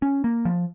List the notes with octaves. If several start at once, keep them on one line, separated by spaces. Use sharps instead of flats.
C#4
A#3
F3